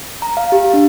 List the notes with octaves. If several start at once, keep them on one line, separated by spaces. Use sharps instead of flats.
A#5
F5
G4
D4